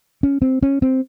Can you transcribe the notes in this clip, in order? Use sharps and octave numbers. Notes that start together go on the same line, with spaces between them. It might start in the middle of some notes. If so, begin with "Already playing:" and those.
C#4
C4
C#4
C4